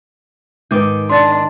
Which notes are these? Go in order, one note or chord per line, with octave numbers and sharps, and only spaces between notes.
G#2 D#3 B4 D6 G6
D4 C6 A6